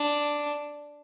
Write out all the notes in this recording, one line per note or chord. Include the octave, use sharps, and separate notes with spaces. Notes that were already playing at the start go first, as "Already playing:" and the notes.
Already playing: D4